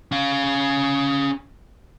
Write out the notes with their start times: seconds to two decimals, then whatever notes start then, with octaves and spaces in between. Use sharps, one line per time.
0.12 C#4 F5